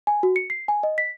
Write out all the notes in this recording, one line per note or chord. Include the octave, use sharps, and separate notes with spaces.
G#5
F#4
C#7
C7
G#5
D#5
B6